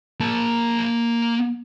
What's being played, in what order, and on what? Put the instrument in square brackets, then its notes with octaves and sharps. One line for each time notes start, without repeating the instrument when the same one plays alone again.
[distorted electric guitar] A#3 A5